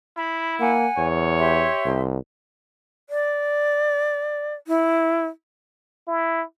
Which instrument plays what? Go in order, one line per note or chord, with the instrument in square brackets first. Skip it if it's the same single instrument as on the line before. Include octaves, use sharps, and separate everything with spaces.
[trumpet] E4 [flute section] B5
[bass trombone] A#3 [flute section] F#5 G#5
[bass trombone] E2 [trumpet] C#5
[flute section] G4 E5 C6
[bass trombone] C2
[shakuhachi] D5
E4
[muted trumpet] E4